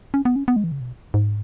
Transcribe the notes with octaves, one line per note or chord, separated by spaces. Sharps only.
C#4
B3
C#4
B3
G#3
E3
C#3
B2
G#2